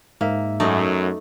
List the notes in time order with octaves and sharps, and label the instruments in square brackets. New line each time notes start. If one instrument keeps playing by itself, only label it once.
[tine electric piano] G#2 E5 [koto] A#3
[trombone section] F#2 [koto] A3 D#4 D5